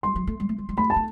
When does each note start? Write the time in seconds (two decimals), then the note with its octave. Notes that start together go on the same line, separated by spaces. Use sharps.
0.03 G3 C6
0.16 F#3
0.27 A3
0.40 G3
0.49 A3
0.58 G3
0.69 G3
0.77 A3 B5
0.90 A5
0.96 A3